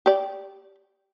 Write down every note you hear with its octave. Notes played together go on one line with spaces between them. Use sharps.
G4 D5